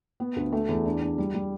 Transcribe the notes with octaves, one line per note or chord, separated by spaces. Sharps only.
B3
D2
A3
E2
D4
D4
G3
G3